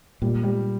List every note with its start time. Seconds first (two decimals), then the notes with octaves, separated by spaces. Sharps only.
0.22 A#2 G3
0.43 G3